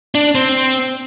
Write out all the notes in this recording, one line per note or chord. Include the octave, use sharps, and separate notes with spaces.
D4
C4